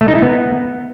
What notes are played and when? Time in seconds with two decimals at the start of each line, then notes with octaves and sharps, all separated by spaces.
0.01 A3
0.08 D#4
0.15 E4
0.22 B3